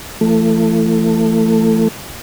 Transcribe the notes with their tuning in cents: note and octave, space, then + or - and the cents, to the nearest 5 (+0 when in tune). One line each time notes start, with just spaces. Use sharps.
E3 +35 A3 +20